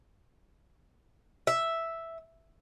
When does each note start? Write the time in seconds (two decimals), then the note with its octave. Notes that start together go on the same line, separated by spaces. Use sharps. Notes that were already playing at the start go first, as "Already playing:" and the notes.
1.47 E5